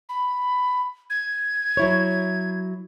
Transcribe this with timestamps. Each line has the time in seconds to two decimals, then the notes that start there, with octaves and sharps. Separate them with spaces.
0.09 B5
1.10 G#6
1.77 F#3 E4 C#5